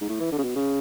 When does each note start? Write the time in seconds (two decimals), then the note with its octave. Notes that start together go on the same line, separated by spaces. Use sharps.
0.01 G#2
0.09 A2
0.20 E3
0.32 D3
0.38 C#3
0.43 B2
0.56 C#3